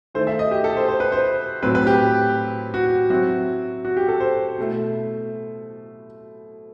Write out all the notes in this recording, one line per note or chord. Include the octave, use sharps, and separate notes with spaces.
D#3 A3 E4 C5
E5
D#5
G4
A4
C5
C5
B4
C5
A2 F#3 C4 B4
B4
G4
F#4
F#3 C4 E4 F#4
F#4
G4
A4
C5
B2 A3 E4